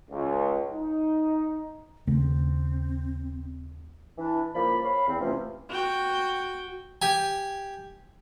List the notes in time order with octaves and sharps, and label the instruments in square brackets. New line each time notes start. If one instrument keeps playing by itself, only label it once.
[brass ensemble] C#2
D#4
[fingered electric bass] D#2 C#3 A3 [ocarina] C4
[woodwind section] E3 D4
C#2 F3 A#3 D5 B5
C#5 F5 B5
E2 C4
C3 E3 F3 A3 C#4
[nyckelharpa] F#4 G5
[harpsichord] G4 G#5